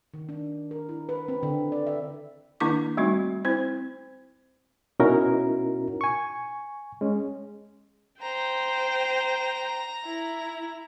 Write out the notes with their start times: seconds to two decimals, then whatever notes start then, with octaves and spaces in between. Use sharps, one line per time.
0.14 D#3
0.29 D4
0.71 A#4
0.89 E4
1.09 B4
1.28 C4
1.43 D3
1.72 D5
1.87 E5
2.60 D#3 A#3 D4 E4 C#6 D6
2.97 G3 A3 C4 D#4 F#4
3.45 C4 E4 C5
5.00 B2 C#4 D#4 E4 F#4 A#4
6.01 G#5 C#6
7.01 G#3 C#4
8.22 C5 G5 A#5
10.06 E4